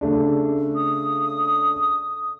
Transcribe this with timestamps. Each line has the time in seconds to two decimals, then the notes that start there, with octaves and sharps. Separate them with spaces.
0.01 C#3 A3 D4
0.75 D#6